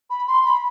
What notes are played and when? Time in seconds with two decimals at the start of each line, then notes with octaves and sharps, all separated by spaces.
0.10 B5
0.28 C6
0.45 B5